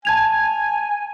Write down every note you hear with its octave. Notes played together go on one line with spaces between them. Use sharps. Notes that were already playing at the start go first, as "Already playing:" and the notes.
G#5 A5 G#6 F7